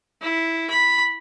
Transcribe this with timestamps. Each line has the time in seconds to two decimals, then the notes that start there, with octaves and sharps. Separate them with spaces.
0.22 E4
0.71 B5